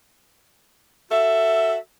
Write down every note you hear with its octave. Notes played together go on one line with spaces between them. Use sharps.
F#4 A4 E5